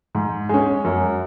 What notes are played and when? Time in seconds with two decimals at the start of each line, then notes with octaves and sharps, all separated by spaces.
0.15 G#2
0.49 G#3 C#4
0.85 F#2